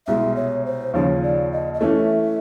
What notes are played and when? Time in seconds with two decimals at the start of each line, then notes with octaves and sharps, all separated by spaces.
0.07 C2 B2 G#3 E5
0.36 C#5
0.66 C5
0.94 D#2 C#3 F3 C#5
1.23 D5
1.52 D#5
1.74 D#5
1.80 E3 A3 C#4 E5